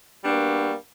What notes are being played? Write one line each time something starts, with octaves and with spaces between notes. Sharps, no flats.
G3 A#3 B3 D4 F#4